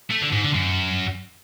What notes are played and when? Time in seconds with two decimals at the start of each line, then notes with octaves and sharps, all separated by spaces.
0.11 A3
0.22 D3
0.33 G#2
0.43 D3
0.54 F#2